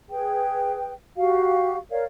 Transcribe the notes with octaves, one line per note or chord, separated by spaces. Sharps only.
G#4 B4 G5
F#4 G4 F5
A#4 C#5 D5 F5